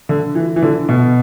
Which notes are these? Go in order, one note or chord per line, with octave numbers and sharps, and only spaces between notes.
D3
E3
E3
D3
B2